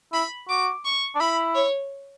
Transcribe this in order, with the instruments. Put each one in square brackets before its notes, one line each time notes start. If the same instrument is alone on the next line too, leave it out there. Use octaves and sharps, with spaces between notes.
[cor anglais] E4 [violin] B5
[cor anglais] F#4 [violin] D6
[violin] C#6
[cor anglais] D4
[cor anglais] E4 [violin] B5
[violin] C#5